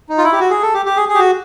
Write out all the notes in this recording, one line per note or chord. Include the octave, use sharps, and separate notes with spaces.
D#4
F4
E4
G4
F#4
G#4
A4
G4
G4
G#4
G#4
G4
F#4